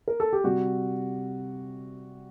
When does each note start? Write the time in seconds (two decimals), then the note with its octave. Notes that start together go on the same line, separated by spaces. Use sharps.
0.08 A#4
0.20 A4
0.33 G4
0.44 C3 G3 F#4